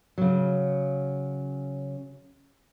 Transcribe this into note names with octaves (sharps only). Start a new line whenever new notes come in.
C#3 F#3